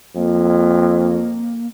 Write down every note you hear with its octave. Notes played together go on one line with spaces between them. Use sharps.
F2 A#3